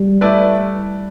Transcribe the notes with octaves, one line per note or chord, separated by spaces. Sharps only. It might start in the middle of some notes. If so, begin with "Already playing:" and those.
Already playing: G3
A3 E4 B4 D5